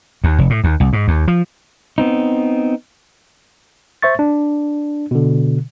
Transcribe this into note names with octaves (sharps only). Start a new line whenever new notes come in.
D#2
F1
A2
D#2
C2
G#2
D#2
F3
B3 C4 D#4
C5 E5 C#6 A6
D4
B2 D3